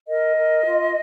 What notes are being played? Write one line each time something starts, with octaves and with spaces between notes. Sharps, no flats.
A#4 D#5
A#4
F4